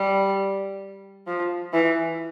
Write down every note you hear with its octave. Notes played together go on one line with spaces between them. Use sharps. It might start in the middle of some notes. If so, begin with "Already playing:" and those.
Already playing: G3
F3
E3